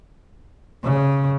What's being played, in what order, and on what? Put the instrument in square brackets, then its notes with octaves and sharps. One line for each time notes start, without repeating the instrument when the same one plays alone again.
[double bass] C#3